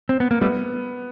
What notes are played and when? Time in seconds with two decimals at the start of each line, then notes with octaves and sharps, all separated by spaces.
0.09 C4
0.20 B3
0.31 A#3
0.41 G3 A3 B3